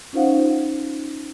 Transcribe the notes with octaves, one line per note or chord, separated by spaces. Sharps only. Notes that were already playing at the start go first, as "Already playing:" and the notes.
C#4 D#4 F4 C5 F5 F#5